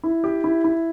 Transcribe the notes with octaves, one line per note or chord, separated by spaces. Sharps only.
E4
G4
E4
E4